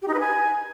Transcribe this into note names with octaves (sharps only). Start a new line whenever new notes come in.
G4
D#4
B4
G#5